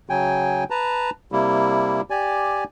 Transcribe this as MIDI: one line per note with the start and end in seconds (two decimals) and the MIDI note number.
0.10 0.64 49
0.10 0.64 54
0.10 0.64 79
0.10 0.64 80
0.70 1.10 71
0.70 1.10 81
0.70 1.10 82
1.32 2.01 48
1.32 2.01 55
1.32 2.01 58
1.32 2.01 64
2.10 2.64 67
2.10 2.64 74
2.10 2.64 80